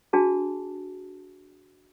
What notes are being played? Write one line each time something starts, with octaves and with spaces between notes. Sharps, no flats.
D4 F#4 G#4 A5